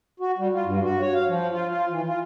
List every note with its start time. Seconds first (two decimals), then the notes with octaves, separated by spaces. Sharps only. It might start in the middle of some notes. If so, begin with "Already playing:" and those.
0.20 F#4
0.38 G3
0.54 F4
0.65 G2
0.83 F#4
1.01 C#5
1.14 F5
1.28 F3
1.52 F4
1.69 F4
1.91 E3
2.07 F4